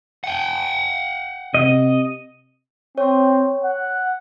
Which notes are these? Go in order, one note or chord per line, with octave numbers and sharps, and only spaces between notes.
F#5 G5
C3 D#5
C4 C#5
F#5